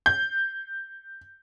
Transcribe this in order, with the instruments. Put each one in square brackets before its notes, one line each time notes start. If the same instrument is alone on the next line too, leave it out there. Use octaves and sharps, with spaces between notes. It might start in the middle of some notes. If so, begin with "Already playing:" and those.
[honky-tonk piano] G6